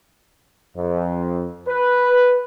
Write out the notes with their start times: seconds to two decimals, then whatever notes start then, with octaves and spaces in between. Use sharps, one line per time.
0.77 F2
1.68 B4